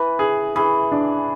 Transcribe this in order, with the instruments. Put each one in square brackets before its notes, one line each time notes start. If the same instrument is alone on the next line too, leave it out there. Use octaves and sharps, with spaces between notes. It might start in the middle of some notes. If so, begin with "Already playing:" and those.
Already playing: [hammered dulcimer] E3 [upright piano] B4
[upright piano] G#4
[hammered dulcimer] E3 [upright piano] G#4
[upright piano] D4